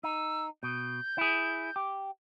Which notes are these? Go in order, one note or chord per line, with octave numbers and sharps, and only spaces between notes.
D#4 E6
B2 G6
E4 G#4
G4